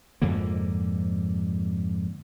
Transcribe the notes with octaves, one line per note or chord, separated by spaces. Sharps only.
F2 G#2 D3 A#3